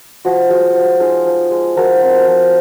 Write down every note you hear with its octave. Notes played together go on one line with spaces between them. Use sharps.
F3 F#4
G#3 F#4
F3
D#4 F4 G#4
F3
G#3
F3 F#4 A#4
C4
F3